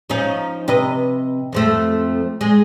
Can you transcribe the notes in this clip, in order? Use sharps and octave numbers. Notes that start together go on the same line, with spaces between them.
F3 C#4 D#4
C3 B4 D#5
F2 F3 A3
G#3